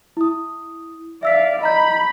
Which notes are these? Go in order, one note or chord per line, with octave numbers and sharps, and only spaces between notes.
E4 D#6
D5 E5 F5 E6 B6
D#5 A#5 B5 G6